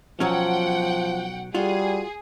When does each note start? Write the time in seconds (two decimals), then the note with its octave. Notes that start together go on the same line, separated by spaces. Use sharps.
0.20 B1 F3 F#3 C#4 F#5 G5
1.55 G3 F4 F#4 G#4